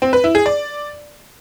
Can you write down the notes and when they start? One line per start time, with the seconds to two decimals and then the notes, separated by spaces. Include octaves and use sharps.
0.02 C4
0.13 B4
0.24 E4
0.35 G#4
0.46 D5